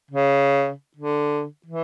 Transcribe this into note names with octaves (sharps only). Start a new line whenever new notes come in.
C#3
D3
E3